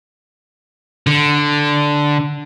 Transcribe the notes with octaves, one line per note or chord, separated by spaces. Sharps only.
D3